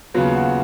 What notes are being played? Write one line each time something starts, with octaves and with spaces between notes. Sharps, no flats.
D#2 C#3 F#3 B3 F4
F#4